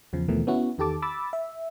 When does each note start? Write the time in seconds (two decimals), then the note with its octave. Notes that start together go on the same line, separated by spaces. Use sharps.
0.13 E2 C#3 F3
0.28 D#2 B2 E3 F3 A3 A#3
0.47 B3 C#4 E4 F#4
0.78 E2 D#3 G4 A4 A5 D6
1.02 B5 D6 E6 A6
1.33 E5